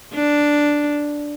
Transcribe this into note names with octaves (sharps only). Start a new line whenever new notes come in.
D4